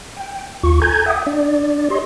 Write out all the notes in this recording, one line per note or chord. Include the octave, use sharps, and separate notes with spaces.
G5
D#2 F4 C#6
A4 G#5 A#5 G6 G#6
E5 F#5 G5 D#6
D4 D5
G4 C#5 D#5 C6